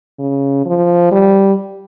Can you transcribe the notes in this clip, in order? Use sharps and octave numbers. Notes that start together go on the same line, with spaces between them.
C#3
F3
G3